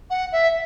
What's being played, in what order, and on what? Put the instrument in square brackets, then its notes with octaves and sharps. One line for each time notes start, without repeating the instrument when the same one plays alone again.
[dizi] F#5
E5